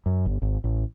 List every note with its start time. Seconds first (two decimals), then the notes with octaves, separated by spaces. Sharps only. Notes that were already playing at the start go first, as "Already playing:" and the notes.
0.06 F#2
0.26 G1
0.42 G#1
0.64 A1